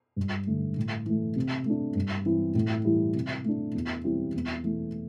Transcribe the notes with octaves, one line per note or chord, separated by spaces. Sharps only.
G2
D3 A3
A2
E3 A3
C3
A3 D4
G2
E3 C4 E4
A2
E3 G3 E4
C3
A3 D4
E2
E3 G3 C4 E4
E2
E3 A3